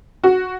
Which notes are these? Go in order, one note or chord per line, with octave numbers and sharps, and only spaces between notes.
F#4